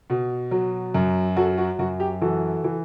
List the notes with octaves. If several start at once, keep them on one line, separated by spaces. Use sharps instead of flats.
B2
F#3
F#2
F#3 F#4 A4
F#4
F#2 F#4
G4
E3 F#4 A4
E3